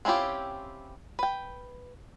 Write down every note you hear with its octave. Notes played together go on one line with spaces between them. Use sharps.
C4 C#4 E4 F4 G4
B4 G5